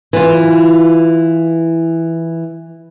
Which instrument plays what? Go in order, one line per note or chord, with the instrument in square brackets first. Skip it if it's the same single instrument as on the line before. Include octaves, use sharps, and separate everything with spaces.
[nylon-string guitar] E3 F4